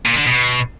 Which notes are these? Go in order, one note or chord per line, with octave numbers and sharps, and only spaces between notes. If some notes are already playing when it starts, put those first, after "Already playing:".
A#2
D3
B2